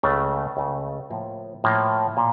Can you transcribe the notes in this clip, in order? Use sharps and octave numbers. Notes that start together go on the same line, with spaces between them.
C#2 C#3 A3
C#2 C#3 A3
A2 F3 A#3
A2 F3 A#3
A#2